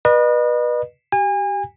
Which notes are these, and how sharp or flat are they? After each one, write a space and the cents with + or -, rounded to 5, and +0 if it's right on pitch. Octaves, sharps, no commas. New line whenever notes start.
B4 -25 D#5 -40
G4 -20 G#5 -35